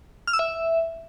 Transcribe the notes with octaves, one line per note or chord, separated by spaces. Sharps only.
F6
E6
E5